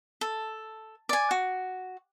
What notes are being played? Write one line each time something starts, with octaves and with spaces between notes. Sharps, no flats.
A4
D5 G#5
F#4